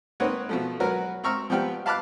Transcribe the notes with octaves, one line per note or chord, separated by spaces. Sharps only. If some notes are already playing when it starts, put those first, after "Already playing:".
A#3 C4 D#4 B4 C#5 F#5
B2 F3 A3
F#3 F#4 A#4 B4
C4 A#5 C#6 E6 F6
F3 G3 B3 G5 F6
F5 A5 B5 D6 F6 F#6